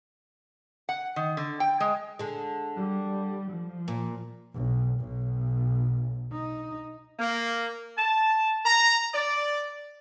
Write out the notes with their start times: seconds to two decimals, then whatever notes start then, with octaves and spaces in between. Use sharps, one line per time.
0.89 F#5
1.16 D#3
1.37 D3
1.60 G5
1.80 G#3
2.19 D3 G#3
2.77 G3
3.51 F3
3.88 A#2
4.54 B1
5.00 B1
6.33 D#4
7.19 A#3
7.98 A5
8.66 A#5
9.14 D5